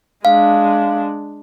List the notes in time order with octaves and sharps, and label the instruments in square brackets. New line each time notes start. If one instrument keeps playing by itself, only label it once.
[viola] G#3 D4 [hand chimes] F5